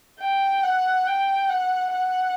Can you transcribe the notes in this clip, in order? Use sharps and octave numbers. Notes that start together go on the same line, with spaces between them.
G5
F#5
G5
F#5
F#5